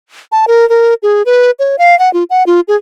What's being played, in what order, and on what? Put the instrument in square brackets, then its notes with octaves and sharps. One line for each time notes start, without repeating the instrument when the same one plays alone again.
[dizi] A5
A#4
A#4
G#4
B4
C#5
F5
F#5
F4
F#5
F4
G#4